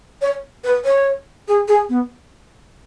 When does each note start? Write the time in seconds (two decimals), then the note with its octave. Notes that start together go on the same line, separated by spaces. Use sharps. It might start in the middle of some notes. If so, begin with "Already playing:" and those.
0.22 C#5
0.64 B4
0.85 C#5
1.48 G#4
1.68 G#4
1.89 B3